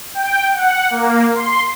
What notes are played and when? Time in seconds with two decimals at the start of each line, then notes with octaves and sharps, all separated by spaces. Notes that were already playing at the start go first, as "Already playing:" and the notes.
0.14 G5
0.53 F#5
0.91 A#3
1.34 C6